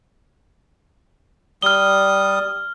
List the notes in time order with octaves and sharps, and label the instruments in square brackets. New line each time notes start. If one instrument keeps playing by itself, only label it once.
[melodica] G3 D#6 [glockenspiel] F6 G7